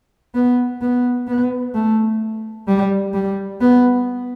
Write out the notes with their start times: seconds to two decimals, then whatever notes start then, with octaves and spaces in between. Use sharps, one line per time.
0.35 B3
0.81 B3
1.28 B3
1.74 A3
2.68 G3
3.14 G3
3.61 B3